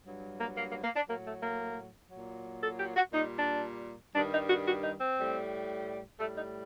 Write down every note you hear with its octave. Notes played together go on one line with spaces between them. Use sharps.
G2 F#3
A#3
A#3
A#3
A#3
D4
F#3 A#3
A2
A3
A#3
F#3
A#2
A4
G4
F#4
A#2 G3 D#4
D4
G2 D#3 G3 D4
D#4
F#4
F#4
D#4
C4
A2 G3
A2 G3 A3
D#4